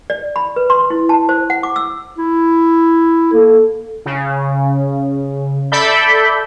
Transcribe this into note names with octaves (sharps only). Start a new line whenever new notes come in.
D5
B5
B4
C6
E4
A5
C5
F#5
D6
E6
E4
A#3 A4
C#3
A4 D5 E5 B5 G6